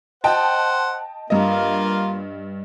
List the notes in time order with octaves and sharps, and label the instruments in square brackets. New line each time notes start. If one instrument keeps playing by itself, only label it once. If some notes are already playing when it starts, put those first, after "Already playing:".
[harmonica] C5 F#5 [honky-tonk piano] D#5 G5 A5
[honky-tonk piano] G2 D#5 [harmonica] A#3 F4